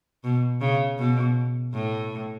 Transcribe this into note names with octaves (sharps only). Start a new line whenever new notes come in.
B2
C#3
B2
A2